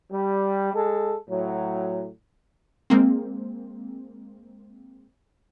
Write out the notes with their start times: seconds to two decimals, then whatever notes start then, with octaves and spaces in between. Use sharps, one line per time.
0.11 G3
0.74 G#3 A4
1.30 A2 F#3
2.90 G#3 A#3 C4